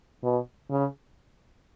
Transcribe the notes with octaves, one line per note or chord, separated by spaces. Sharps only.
B2
C#3